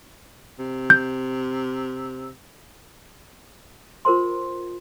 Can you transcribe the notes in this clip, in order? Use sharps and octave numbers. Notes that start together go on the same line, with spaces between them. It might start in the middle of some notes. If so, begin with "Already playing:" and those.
C3
G6
F4 A#4 C5 C6